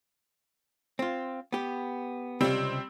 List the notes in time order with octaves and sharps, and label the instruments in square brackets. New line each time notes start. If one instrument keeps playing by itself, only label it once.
[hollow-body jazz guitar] C4 F4
B3 G4
[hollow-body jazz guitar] C#2 C3 [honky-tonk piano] G3 C4